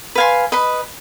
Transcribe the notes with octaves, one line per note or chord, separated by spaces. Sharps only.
B4 F5 G#5 C6
B4 D#5 B5